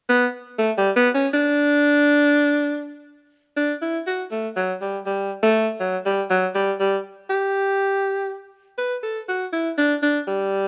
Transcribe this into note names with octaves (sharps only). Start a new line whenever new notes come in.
B3
A3
G3
B3
C#4
D4
D4
E4
F#4
A3
F#3
G3
G3
A3
F#3
G3
F#3
G3
G3
G4
B4
A4
F#4
E4
D4
D4
G3